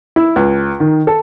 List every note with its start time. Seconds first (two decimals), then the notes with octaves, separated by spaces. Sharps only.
0.16 E4
0.36 C#2
0.80 D#3
1.07 A4